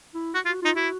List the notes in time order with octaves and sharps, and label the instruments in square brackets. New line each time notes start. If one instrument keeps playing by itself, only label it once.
[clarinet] E4
[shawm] F#4
F4
[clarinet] F#4
[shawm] D#4 [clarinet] F4
[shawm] E4 [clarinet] F#4